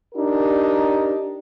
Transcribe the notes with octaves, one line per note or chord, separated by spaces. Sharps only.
D4 D#4 G4 A#4